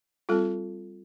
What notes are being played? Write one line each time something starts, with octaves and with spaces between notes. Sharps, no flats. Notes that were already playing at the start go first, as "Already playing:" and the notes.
G3 C4 F4 A4